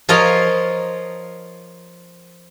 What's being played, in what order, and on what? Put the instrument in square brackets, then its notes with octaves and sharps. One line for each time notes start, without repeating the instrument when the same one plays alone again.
[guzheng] F3 F4 A#4 C#5 D#5 A#5